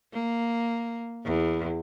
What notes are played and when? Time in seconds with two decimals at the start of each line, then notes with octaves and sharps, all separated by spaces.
0.13 A#3
1.24 E2